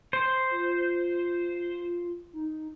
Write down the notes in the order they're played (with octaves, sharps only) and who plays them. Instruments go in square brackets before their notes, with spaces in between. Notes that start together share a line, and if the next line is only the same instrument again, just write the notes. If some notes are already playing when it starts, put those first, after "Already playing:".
[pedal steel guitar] C5
[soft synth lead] F4
D#4